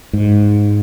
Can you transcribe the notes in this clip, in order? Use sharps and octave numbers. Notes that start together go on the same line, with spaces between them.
G#2